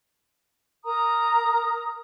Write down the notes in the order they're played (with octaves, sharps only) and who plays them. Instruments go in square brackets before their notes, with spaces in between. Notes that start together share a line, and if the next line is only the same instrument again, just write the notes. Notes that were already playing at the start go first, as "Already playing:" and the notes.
[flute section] A#4 A#5 D#6